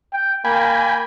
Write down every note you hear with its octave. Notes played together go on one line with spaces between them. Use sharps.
G5
A#3 G5 G#5 B5